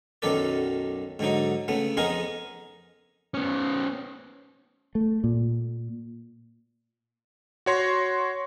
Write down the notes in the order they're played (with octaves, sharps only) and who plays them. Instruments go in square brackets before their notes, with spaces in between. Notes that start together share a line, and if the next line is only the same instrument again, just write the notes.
[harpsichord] B1 F#2 D#3 A4 B4 D5
G#2 D3 F#3 D#4
C#3 A3 B3
F2 B3 D#4 G#4 A#4
[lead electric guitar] B3 C#4
[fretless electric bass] A3
A#2
[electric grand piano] F#4 C#5 C6 A#6